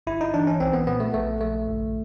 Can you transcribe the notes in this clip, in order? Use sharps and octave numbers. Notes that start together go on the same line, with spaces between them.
G1 E4
D#4
E3 D4
C#4
B1 C4
B3
A#2 B3
A3
A#1 A3
A#1 A3
G1